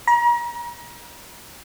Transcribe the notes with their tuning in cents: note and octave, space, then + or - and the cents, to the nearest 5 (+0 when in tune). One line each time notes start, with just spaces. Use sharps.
A#5 +40